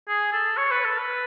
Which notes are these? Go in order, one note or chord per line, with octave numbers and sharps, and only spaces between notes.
G#4
A4
C#5
B4
A4
B4